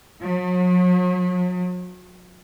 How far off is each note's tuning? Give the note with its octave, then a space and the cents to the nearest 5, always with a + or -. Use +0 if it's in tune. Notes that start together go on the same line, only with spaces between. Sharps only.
F#3 -40